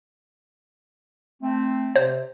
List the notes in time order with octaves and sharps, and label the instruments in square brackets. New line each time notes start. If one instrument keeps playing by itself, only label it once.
[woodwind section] A3 C4
[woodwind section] C3 [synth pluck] C5